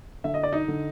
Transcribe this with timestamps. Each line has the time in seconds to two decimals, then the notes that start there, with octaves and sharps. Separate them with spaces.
0.24 D3 E5
0.34 D#5
0.43 D5
0.53 D#4 D#5
0.68 D3